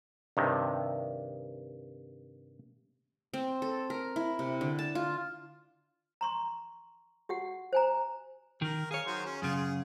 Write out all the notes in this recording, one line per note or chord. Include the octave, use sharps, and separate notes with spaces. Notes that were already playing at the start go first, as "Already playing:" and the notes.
G2 C3 D#3
C4
A4
A#4
E4
C3
D3
A5
F4
A#5 C6 C#6
F#4 G4 F#5
C5 G#5 A#5
D#3 A#4
G#4 C#5 F5
D#3 F#3 C5
C#4
F#2 C#3 F4 G#4
G#4